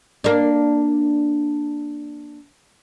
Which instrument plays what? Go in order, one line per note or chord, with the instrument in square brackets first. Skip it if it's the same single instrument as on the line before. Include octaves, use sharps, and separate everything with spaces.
[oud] A#3 D4